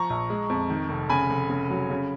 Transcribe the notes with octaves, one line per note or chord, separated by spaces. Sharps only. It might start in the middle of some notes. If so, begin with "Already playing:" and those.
Already playing: F3 A#5 C#6
A#1
G#3
F2
D#3
F1
C#3 G#5 B5
F1
C#3
F#3
C#3